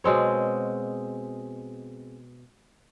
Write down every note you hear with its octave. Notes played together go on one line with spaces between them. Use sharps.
B2 G#3 C4 C#5